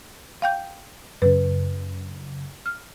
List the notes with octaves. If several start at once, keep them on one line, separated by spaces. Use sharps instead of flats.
F5 G5 G6
F#2 C#3 B4
F6